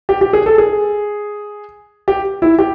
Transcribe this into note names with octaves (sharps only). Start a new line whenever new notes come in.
G4
G4
G#4
A4
G#4
G4
E4
G4